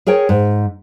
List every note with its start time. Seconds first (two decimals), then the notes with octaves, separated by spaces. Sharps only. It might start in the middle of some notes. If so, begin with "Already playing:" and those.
0.07 G#4 A#4 C#5 G5
0.29 G#2